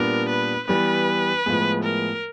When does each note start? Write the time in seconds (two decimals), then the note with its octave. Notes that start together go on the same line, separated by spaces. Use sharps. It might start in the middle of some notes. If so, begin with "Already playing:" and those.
Already playing: A#2 G3 B3 D4 A#4
0.29 B4
0.67 E3 G3 B3 B4
1.46 A2 F3 G#3 B3
1.83 A#4